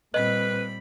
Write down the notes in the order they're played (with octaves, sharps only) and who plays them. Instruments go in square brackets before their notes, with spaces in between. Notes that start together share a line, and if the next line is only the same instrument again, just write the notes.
[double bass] A#2 C4 [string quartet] G3 B5 [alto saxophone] B4 [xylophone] D#5 F#7